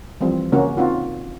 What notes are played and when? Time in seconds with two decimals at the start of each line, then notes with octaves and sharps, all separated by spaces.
0.21 E3 F3 G3 C4
0.52 C#3 A#3 C#4 F#4
0.77 C4 D#4 F4 F#4